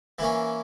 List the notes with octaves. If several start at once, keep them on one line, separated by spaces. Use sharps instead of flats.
E3 A#3 C#4 E4